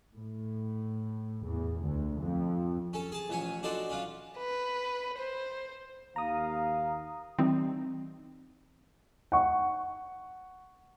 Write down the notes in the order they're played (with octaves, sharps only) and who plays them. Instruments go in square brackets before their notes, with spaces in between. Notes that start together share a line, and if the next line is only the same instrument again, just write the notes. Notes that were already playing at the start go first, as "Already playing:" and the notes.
[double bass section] A2
E2
D2
F2
[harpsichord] C#4 A4
G#4 A5
A1 F2 C#4 C#5 G#5
D4 D#4 F#4 A4 C5 D5
C#4 D4 F4
[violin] B4
C5
[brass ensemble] D#2 F5 [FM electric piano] A#5 D#6
[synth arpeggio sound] E3 G3 D#4 [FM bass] C4
[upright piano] F#5 C#6